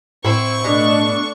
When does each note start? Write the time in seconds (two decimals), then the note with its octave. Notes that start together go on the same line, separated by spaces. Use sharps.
0.24 A2 C4 E4 C#6
0.64 B2 A3 D4